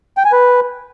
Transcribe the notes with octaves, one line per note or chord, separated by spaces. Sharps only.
G5
G#5
B4